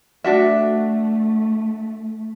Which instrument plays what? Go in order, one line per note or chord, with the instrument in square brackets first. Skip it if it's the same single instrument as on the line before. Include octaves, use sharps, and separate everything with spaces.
[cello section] A3 [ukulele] D4 F#4 E5